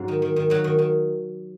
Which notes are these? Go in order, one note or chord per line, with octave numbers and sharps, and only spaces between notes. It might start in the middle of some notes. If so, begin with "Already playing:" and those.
Already playing: G#2 F#3 C#4
D#3
D#3
D#3
D#3 F#3
D#3
D#3